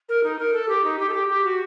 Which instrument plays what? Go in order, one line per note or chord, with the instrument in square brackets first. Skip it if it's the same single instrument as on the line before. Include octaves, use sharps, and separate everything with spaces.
[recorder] A#4
D#4
A#4
A4
G4
D#4
G4
A4
G4
G4
F#4